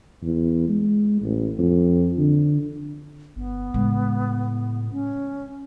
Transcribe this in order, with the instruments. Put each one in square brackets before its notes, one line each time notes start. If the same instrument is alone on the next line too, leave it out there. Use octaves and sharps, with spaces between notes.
[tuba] E2
G#3
A1
F2
D3
[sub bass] G1 [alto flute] B3
[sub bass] A2 [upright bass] C#3 G#3
[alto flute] C#4